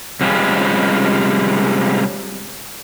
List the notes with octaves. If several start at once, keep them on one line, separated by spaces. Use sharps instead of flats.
C3 F3 G3 G#3 C#4